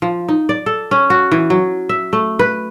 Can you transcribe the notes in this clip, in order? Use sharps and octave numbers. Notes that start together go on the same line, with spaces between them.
F3
D#4
D5
A4
C#4
F#4
E3
F#3
E5
A3
B4